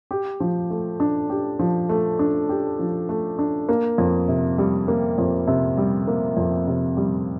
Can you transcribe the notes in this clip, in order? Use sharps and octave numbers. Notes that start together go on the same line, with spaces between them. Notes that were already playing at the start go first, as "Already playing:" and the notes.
G4
F3
A3
D4
G4
F3
A3
D4
G4
F3
A3
D4
A#3
F2
C3
G3
A#3
F2
C3
G3
A#3
F2
C3
G3